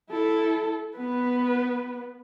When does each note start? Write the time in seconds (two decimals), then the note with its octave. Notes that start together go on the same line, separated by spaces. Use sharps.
0.10 E4 A4
0.97 B3 B4